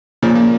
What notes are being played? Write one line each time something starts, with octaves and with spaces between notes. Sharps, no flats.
A#2 C#3 F3
A#3